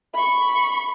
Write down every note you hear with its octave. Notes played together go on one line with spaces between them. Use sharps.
B5 C#6